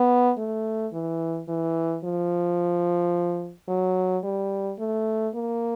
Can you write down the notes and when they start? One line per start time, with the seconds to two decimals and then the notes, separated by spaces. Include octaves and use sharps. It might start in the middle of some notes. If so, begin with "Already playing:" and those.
Already playing: B3
0.38 A3
0.93 E3
1.48 E3
2.04 F3
3.68 F#3
4.24 G3
4.79 A3
5.34 A#3